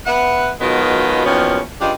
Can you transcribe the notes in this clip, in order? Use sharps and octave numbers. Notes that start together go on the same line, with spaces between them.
B3 B4 E5 F#5
B2 D#3 F#3 G#3 B3 F4
E2 B2 D#3 F3 A#3 C#4
G2 C#3 G3 D4 F4 D#5